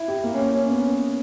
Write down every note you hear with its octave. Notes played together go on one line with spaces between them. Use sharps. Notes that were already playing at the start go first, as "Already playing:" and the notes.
Already playing: E4
G4
A#3
C#4
C#4
B3